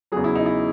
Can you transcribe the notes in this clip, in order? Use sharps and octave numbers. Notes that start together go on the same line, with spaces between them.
E2 C#3 F#3 G#4
E4
D#4
E4